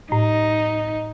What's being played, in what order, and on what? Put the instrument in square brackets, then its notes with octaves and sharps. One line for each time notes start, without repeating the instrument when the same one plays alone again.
[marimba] A2 [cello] D#4